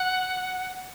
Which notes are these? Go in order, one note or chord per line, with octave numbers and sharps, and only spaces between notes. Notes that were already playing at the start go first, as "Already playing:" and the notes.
Already playing: F#5